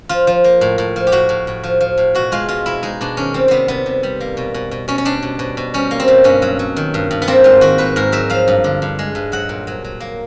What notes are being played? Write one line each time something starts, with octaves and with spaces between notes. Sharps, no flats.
F3 F4
F3
A#3
A2
A2
F3
G4
A2 F#4
A2
A2
F3
F3
A2
B2 F#4
G#3 F4
B2 F4
B2 E4
G#3 D#4
B2 D4
D#3 C#4
G3 C4
C3 B3 C4
C3 B3
C3
G3
A#3
B2
B2
B2
B2 C#4
C#4
G3 D4
B2
B2
B2
G3 C#4
A#3
C4
B2
G2 C#4
F#3
F#3
D#3
G2
G2
B3
A#3 C4
G#2 F4
D#3 F#4
G#2 B4
G#2 A#4
F#3 E5
F3 F5
G2
D3
G2
G#3
G2
F#3 F#5
A#2
F#3
F#3
A#3